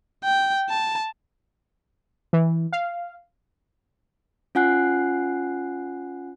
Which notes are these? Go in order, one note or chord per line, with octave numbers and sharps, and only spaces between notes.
G5
A5
E3
F5
C#4 F4 F#5 G#5 F#6 C7